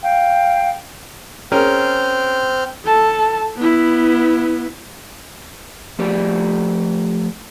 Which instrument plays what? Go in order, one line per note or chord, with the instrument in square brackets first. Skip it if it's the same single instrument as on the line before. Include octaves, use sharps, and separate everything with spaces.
[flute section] F5 G5
[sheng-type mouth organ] C4 F6 G6 [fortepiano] C#4 G#4 A#4
[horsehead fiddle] A4 A5
B3 E4
[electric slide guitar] F3 A3 G4 D5